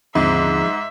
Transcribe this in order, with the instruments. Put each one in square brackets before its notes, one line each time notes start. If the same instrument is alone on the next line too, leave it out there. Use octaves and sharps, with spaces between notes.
[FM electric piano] D#2 D3 C4 [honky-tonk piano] G#2 [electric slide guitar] F3 G#4 [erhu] E5